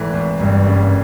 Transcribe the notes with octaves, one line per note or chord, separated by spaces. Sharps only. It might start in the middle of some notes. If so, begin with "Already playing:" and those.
Already playing: G#1 E3 A3
G#1
F#1 G2
C#3